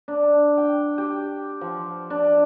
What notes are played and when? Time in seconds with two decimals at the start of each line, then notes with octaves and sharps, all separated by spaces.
0.08 D4
0.58 G5
0.98 G4
1.61 F3
2.10 D4